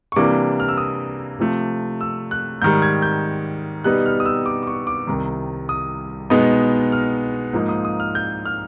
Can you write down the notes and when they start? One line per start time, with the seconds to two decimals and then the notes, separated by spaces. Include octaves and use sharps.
0.12 C#6
0.16 C3 E3 G3 A#3 D4 D6
0.60 F6
0.69 E6
0.78 D#6
1.39 C3 F3 A3
2.01 E6
2.31 F#6
2.62 G#2 D#3 G3 G6
2.82 G#6
3.02 G6
3.84 B2 G3 B3 D#4 F#6
4.06 F6
4.20 D#6
4.26 E6
4.46 D6
4.63 D6
4.67 C#6
4.87 D6
5.07 C2 C3 D#3
5.69 D#6
6.30 B2 G#3 B3 D#4
6.92 F6
7.53 G#2 F3 A#3 D#4
7.69 D#6
7.85 D#6
8.00 F6
8.15 G6
8.46 F6